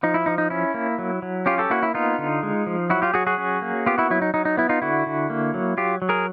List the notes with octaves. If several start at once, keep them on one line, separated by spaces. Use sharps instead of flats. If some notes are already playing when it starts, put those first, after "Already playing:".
F3 D#4
E4
F3 D#4
D#4
C#4 E4
A#3
F#3
F#3
C#4 F4 G4
G4 A4
A#3 E4 F#4
E4
B3 D#4 F4
D3
G#3
F3
F#3 E4 F#4
F4 G4
F#3 F#4 G#4
F#4 G#4
C#4
A#3
B3 F4 G4
E4 F#4
F#3 E4
D#4
F#3 D#4
D#4
B3 E4
D#4 F4
D3 E4 F#4
D3
A#3
F#3
F#3 F4 G4
F#3
G#4 A#4